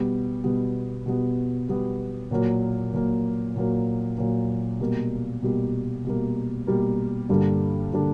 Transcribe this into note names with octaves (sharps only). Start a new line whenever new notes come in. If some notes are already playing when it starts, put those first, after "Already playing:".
Already playing: B2 G3 B3
B2 G3 B3
B2 G3 B3
B2 G3 B3
A#2 F#3 A#3
A#2 F#3 A#3
A#2 F#3 A#3
A#2 F#3 A#3
B2 G3 A#3
B2 G3 A#3
B2 G3 A#3
B2 G3 A#3
G2 D3 G3 A#3 D4
D3 G3 A#3 D4